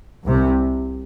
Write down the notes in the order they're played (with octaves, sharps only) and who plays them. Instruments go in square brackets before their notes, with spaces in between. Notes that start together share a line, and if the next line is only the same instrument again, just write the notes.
[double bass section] C2 C3